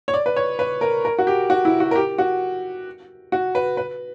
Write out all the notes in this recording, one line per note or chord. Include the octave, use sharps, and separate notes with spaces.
C#5
D5
B4
C#5
B4
A#4
A#4
F#4
G4
F#4
E4
F#4
A#4
G4
F#4
F#4
B4
B4